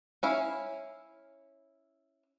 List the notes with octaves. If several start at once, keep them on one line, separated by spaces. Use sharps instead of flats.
C#4 E4 F5